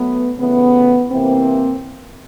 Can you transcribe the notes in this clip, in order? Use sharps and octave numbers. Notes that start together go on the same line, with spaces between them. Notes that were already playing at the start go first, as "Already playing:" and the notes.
Already playing: F#3 A3 B3
C#3 E3 A3 B3
C3 E3 A#3 C4